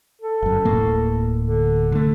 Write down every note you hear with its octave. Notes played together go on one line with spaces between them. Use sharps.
A4
G1 F#2
D1 A2 A#3
D3
D3 A3